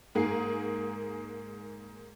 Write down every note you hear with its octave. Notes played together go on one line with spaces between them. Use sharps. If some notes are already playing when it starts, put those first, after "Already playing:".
G#2 A#3 G#4 C7